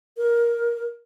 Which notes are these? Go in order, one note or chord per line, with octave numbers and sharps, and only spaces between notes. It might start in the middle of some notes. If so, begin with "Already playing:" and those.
A#4